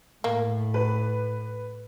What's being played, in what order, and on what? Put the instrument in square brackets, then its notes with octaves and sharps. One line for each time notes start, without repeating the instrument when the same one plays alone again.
[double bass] A2 [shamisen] A#3
[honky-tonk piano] B4